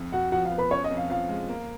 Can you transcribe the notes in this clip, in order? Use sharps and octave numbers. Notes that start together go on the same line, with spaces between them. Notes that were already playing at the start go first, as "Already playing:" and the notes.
Already playing: F2
F2 F#4 F#5
F3 F#4 F#5
F5
B3
B4 B5
C#4 C#5 C#6
D#5
F2
F5
F3 F5
G#3
A#3